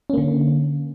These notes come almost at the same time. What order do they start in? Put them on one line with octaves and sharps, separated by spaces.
C#4 A#3 D3